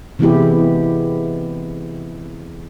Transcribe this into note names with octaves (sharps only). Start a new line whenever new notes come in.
C3 E3 G#3 B3 E4 G4